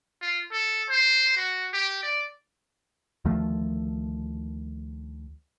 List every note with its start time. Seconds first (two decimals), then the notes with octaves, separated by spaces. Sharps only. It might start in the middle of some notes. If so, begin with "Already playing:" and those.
0.21 F4
0.52 A4
0.90 C5
1.37 F#4
1.73 G4
2.03 D5
3.25 D2 D#3 F3 A3